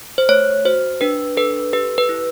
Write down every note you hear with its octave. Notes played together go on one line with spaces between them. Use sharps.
C5
A3 C#5
F#4 C5
D4 B4
A4 B4
G4 B4
B4
E4